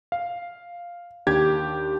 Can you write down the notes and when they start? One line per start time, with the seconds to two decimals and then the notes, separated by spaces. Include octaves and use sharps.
0.12 F5
1.27 D#2 D4 G4 G#6